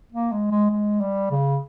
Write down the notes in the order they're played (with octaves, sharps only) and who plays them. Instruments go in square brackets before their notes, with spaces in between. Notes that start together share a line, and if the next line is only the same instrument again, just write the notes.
[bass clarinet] A#3
G#3
G#3
G#3
G3
C#3